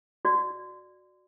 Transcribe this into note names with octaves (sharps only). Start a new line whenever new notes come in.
F#4 D5